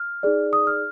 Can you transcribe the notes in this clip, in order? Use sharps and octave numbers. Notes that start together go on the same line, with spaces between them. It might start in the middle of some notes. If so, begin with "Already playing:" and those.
Already playing: F6
D#4 G#4 D5
D#6
F6